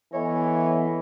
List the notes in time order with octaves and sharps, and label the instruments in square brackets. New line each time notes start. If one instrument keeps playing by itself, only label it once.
[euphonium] E3 [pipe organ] B3 A4 D#5 [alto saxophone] C#5